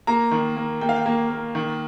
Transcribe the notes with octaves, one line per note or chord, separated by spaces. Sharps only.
A#3 A#5
D#3
A#3
A#3 G5
F5
G5
A#3
A#3
D#3